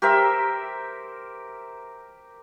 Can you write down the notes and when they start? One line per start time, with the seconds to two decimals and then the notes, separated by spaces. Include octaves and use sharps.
0.02 G4 A#4 C5 E5